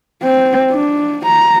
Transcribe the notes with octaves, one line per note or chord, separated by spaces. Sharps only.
C4
D4
A#5